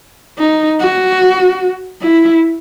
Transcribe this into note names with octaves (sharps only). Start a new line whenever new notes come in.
D#4
F#4
E4